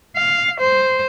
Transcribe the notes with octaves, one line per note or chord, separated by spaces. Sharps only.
F5
C5